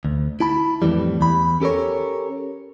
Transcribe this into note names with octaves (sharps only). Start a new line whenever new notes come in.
D2
E4 A5 B5
F2 A2 C#3 E3 G3
E2 B5
C#4 G4 A4 A#4 C#5